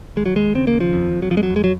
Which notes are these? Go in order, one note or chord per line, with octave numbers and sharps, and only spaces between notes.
D#2 G#3
F#3
D#2 G#3
C#3 C4
A#3
D#2
F3
F2
F2
F#3
F2 F3
G#3
F#3
F2
G#3
F#3